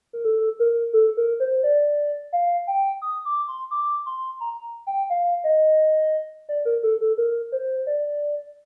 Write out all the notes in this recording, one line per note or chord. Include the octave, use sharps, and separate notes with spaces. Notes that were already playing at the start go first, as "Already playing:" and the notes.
A#4
A4
A#4
A4
A#4
C5
D5
F5
G5
D#6
D6
C6
D6
C6
A#5
G5
F5
D#5
D5
A#4
A4
A4
A#4
C5
D5